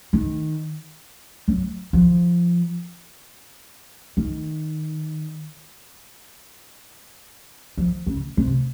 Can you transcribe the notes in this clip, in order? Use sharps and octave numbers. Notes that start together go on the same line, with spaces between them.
D#3
F#3
F3
D#3
F3
C#3
C3